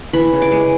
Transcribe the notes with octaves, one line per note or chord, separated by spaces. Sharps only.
E3 B5
C#3
D6
G#3